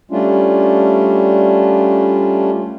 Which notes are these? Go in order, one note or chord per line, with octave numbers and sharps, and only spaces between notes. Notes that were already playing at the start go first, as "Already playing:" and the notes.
G3 A3 C#4 D4 F4